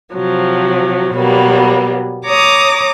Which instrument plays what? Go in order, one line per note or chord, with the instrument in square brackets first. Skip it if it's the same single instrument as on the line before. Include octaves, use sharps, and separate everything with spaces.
[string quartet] C3 F3 F#3
B2 F#3 G3 A#3 B3
C#5 A#5 D6 D#6